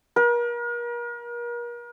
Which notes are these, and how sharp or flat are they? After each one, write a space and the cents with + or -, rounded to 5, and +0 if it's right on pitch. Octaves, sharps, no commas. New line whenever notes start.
A#4 +40